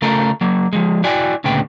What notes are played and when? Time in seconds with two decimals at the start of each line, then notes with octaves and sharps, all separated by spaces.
0.02 C#3 A3 F4 A4 A#4
0.41 F#3 A#3
0.73 F3 G#3
1.04 E4 F#4 D5 G5 G#5
1.44 D2 A#2 C#3 B3 G5